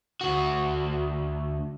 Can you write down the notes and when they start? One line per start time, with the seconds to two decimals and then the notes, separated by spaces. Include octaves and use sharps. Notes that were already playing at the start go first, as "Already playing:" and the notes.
0.21 D2 F#4